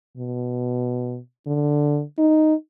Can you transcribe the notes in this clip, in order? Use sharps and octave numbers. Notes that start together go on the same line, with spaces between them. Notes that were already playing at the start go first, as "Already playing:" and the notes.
B2
D3
D#4